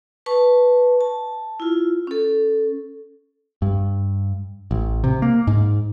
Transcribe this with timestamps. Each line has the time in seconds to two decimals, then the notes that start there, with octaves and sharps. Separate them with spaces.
0.26 B4 A5 C#6
1.01 A5
1.60 E4 F4
2.07 C#4 A4
3.62 G2
4.71 A1
5.04 C3
5.22 A#3
5.47 G#2